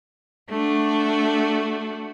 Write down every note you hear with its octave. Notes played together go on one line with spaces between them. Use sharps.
A3 D4 F#4